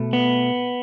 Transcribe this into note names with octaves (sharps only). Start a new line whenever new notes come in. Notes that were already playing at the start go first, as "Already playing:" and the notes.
Already playing: B2 A3
B3